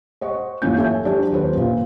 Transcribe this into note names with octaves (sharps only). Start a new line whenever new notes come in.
C5 D#5 F#5 C#6
A1 F#2 A#3 C#4 F4 G6
A4 C#5 E5 G#5
F#3 D4 F#4 G4 A4 C5
D#1 F#4 B4 C5
F#2 A#2